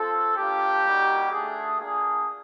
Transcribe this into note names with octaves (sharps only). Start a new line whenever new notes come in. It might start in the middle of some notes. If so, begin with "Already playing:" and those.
Already playing: C4 F4 A4
A#3 D4 F4 G4
G3 A#3 D#4 F#4
A3 D4 F#4 G#4
A#3 D4 F4 G#4